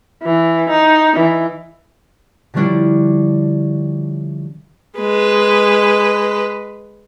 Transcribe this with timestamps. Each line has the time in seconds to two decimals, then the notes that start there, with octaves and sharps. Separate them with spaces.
0.23 E3
0.70 D#4
1.17 E3
2.54 D3 F3 G3 C#4 D4 E4
4.99 G#3 B4